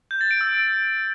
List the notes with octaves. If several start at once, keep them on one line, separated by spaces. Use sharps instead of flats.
G6
A6
D7
E6